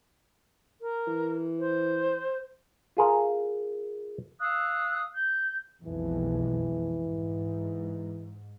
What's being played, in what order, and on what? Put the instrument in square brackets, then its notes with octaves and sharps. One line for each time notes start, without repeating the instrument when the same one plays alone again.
[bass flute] A#4
[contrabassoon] E3
[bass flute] C5
[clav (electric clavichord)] F4 G#4 A#4 F5
[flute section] F5 D#6 E6 F#6
G6
[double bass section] B1 F2 G#3 [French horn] E3
[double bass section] G#2